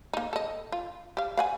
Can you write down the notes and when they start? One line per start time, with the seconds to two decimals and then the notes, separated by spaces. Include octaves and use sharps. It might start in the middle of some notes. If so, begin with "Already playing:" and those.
0.13 A#3 D#4
0.33 A4 D#5
0.72 F4
1.17 G4 F5
1.37 F5 F#5 G#5